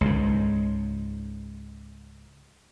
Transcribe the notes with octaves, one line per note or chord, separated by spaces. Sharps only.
C#2 G#2